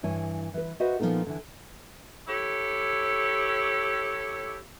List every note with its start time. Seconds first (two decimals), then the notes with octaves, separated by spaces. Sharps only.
0.03 G2 E3 C#5 G#5
0.54 E3 B4
0.80 F#4 B4 C5 D#5 E5 F#5
1.00 A#2 F3 G#3 B3 D#4 A4
1.27 D3 E3
2.28 E4 G4 A4 C#5